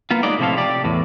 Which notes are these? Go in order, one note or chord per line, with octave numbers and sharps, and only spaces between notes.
A#3 B3 F4
F#3 G#3 D#4 D5
A2 C3 F3 E4 A4 F5
G4 D5
E2 A2